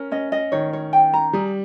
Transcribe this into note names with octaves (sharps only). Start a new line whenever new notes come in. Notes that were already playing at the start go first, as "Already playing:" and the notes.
Already playing: C#4 A#4
C#4 D#5
D#5
D#3 C#5
C#5
G5
A#5
G3 G#4